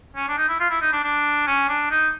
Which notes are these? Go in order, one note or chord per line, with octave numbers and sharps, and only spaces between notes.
C#4
D4
D#4
E4
F4
E4
D#4
D4
D4
C#4
D4
D#4